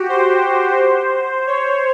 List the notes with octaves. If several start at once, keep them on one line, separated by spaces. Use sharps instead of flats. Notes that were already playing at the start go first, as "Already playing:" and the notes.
Already playing: F#4 G4
C5
C#5